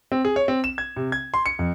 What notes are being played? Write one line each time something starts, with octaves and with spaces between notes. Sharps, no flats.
C4
G#4
C#5
C4
E7
G#6
C3
G#6
C6
C#7
F2